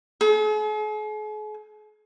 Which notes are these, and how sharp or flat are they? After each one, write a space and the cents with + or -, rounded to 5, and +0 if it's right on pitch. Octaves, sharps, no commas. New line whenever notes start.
G#4 +45